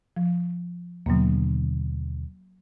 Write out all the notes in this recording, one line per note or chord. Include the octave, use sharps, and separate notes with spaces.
F3
D#2 B2 D3 F#3 A#3